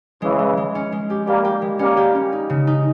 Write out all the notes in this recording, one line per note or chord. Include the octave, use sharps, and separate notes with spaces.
C#3 E3 G#3
G#3
G#3
C#4
G#3
G4
G3 A#3 G4
G4
G#3
G3 A#3 C#4
G4
C#4
D#4
C#3
D#4